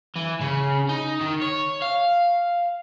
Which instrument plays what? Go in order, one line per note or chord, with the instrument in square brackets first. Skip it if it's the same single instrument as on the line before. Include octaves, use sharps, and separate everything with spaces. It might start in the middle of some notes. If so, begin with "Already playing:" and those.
[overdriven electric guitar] E3
C#3
D#4
D#3
C#5
F5